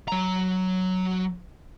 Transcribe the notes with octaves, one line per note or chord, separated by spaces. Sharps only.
F#3 A#5